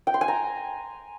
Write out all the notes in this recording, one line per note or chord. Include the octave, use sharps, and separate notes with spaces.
G5
C6
G#5
A#5